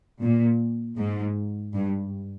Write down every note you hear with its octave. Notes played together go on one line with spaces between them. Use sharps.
A#2
G#2
G2